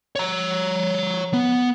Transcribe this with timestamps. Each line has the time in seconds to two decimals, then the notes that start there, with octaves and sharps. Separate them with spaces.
0.16 C#5 A#5
1.33 B3